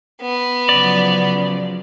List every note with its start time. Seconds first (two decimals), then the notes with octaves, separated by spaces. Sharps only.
0.21 B3
0.69 C#3 F3 F#3 D5